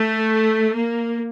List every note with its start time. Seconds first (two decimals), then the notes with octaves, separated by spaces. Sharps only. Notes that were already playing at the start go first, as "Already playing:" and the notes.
Already playing: A3
0.74 A#3